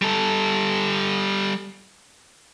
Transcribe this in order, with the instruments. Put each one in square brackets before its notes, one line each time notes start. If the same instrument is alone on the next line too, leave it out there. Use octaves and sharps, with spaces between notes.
[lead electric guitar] G3 A4